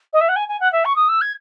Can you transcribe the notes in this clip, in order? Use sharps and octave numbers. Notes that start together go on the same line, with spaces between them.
D#5
E5
F#5
G#5
G#5
F#5
E5
C#6
D#6
E6
G#6